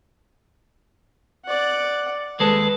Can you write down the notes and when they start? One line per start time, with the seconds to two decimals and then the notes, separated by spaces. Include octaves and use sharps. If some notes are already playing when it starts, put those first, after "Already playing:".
1.46 D5 F#5
2.40 D#2 G#3 A4 B4